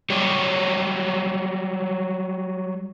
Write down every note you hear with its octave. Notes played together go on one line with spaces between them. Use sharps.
F#3 G3 G4 G#4 C#5